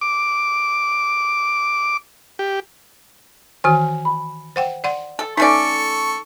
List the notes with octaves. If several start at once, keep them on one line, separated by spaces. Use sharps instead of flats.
D6
G4
D#3 E3 F#4 G#5 F6
B5
C5 F#5 G5
D5 F#5 C6
A4
A3 C#4 D#4 A4 D5 C#6